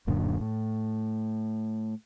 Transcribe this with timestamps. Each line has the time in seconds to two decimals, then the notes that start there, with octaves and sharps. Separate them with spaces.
0.07 D1 F#2 A#2 D3
0.40 A2